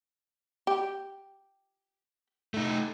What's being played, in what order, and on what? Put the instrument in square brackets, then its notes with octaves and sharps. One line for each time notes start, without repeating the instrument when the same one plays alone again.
[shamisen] G4
[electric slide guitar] A3 D#4